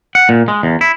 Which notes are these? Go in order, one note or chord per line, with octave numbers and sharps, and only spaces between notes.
F#5
A#2
G#3
E2
E4